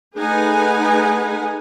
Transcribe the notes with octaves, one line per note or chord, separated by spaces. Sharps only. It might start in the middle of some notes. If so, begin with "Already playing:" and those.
A3 D#4 G#4 B4 F#5 G#5